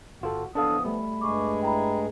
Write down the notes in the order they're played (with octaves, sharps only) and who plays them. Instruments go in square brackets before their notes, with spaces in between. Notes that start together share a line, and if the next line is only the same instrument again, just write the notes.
[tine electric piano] G1 F4 A4 [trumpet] F#4
[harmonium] E3 F3 B3 [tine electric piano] D4 A4 F5 [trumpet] D#6
[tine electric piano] G3 A3 [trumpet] B5
[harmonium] G2 G#3 G#4 [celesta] C#6 D6
[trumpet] E4 [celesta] G5 A#5 B5